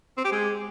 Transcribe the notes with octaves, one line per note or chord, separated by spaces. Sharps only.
C4
G4
G#3